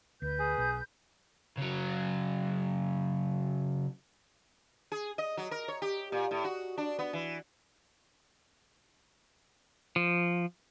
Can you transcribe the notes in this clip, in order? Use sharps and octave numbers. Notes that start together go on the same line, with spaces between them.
D2 B4 G6
G#4
B1
C#3 F#3
G#4
D#5
F#3
A#4
C#5
G4
A#2
A2
F#4
D4
B3
E3
F3